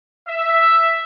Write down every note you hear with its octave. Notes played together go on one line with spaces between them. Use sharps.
E5